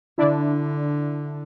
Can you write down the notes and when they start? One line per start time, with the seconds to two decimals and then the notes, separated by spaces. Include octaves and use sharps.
0.18 D3 D4 E4